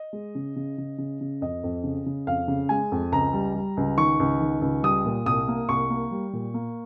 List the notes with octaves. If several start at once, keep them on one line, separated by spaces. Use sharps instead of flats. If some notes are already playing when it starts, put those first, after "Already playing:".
Already playing: D#5
G#3
C#3
C#3
C#3
C#3
C#3
F2 D#5
F2
C#3
C#3
F2 F5
C#3
G#3 G#5
F2
C#2 A#5
G3
G3
C#2
D#3 C#6
C#2
D#3
C#2
G3 D#6
A#2
C2 D#6
A#3
C2 C#6
A#3
G3
A#2
A#3